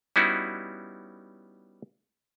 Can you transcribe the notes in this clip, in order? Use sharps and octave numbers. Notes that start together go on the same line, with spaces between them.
G3 B3 C#4 D#4 E4 F#4